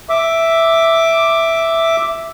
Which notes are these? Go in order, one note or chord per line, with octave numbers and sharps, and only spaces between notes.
E5 D6